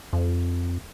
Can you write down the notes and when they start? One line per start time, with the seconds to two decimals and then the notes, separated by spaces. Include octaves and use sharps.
0.13 F2